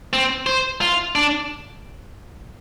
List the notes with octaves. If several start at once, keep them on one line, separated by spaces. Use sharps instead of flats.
C4
C5
F4
D4